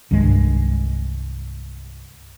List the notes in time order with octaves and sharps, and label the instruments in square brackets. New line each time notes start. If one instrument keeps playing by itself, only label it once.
[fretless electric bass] C2 G2 D#3 G#3